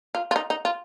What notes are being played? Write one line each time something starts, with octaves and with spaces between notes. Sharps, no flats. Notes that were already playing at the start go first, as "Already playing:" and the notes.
F4
F4
D#4
D#4
F4